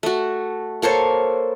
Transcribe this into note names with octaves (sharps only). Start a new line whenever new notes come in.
A3 F#4
A#3 A4 C5 C#5